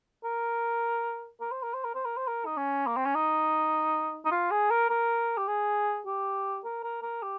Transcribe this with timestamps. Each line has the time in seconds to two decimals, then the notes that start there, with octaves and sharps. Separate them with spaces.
0.25 A#4
1.40 A#4
1.51 C5
1.63 A#4
1.74 C5
1.84 A#4
1.95 C5
2.05 A#4
2.17 C5
2.27 A#4
2.46 D#4
2.57 C#4
2.86 A#3
2.96 C4
3.06 C#4
3.15 D#4
4.25 D#4
4.31 F4
4.51 G#4
4.70 A#4
4.90 A#4
5.37 G4
5.48 G#4
6.06 G4
6.65 A#4
6.83 A#4
7.02 A#4
7.22 G4